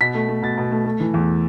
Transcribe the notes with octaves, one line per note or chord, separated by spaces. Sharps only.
B2 B6
A3
A3
B2 A6
B2
A3
A3
E3
E2